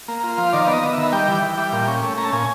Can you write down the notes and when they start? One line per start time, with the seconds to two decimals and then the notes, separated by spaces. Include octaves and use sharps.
0.08 A#3
0.23 F4
0.38 F3
0.53 D#3 D5
0.67 B3 D5
0.73 D#5
0.83 B3
0.93 D#3 E5
1.13 G3 G5
1.28 E3
1.42 E3
1.58 G3
1.73 A#2
1.88 C#4
2.03 A3
2.17 C#4 A#5
2.25 A5
2.32 A#2 G#5